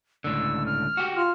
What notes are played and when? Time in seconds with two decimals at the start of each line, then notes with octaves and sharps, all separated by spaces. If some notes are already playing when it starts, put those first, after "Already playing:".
0.24 C#2 A2 D3 E6
0.66 F6
0.97 F#4 G4
1.15 F4 F6